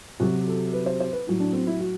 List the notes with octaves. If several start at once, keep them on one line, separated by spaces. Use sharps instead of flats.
C3 F#3 F#4
A4
B4
C5
C5
B4
A2 F#3
D4
C4
E4
F#4